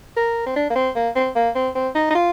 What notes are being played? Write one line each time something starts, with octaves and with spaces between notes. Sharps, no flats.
A#4
C4
D4
A#3
C4
A#3
C4
A#3
C4
C4
D#4
D#4
F4